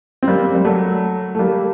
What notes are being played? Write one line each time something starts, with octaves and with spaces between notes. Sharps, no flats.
C4
G3 A#3
G3
F#3 A3
A3
G3 A#3